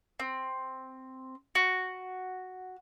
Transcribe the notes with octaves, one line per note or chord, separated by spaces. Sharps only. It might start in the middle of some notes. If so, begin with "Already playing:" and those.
C4
F#4